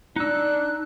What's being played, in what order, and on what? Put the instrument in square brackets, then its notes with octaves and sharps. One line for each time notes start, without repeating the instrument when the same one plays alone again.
[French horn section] D4 [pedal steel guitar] D#4 E6 [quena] F#6